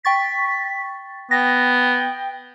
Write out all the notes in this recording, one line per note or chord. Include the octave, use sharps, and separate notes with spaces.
G5 C#6 A6 B6
B3 G5 A#6